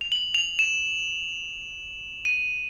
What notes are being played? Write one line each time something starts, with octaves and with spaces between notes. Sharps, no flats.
F7
F#7
F7
E7
D#7